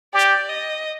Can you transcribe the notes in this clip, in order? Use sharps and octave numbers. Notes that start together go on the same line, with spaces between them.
G4 D5
D#5